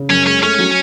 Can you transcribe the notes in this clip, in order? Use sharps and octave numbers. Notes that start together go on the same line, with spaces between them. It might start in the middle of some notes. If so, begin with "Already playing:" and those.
Already playing: C#3
F#2 C#4
G#3 C#4
A3 C#4
F#3